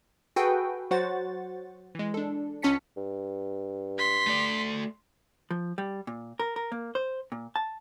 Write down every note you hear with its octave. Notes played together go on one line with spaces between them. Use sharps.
F#4 G#4 A4 B4 G5
F#3 F#4 C5 F#5 A6
E3 G#3
D4 A4
C#2 C#4 C#5 A5 B6 C#7
G2
C6 B6
A3 D5
F3
G3
A#2
A#4
A#4
A#3
C5
A#2
A5